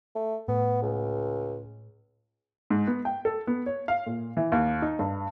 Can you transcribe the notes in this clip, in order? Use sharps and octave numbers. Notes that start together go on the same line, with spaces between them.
A3
A2 B3
C#2
G#2
B3
G5
A4
B3
C#5
F5
A#2
E3
D#2
D#4
G2